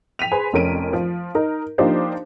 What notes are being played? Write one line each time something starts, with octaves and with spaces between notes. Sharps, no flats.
G5 B6 D#7 F7
G#4 B4 C5 G#5 C6
F1 F2 C#4 A#4 D7 D#7
F3
D#4 A#4
F3 A#3 D4 D#4 G4 C5